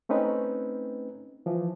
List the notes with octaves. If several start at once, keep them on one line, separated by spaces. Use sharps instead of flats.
A3 C4 C#4 D#4 B4
E3 F3